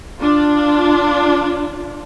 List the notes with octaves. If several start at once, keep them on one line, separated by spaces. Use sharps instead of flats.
D4 F4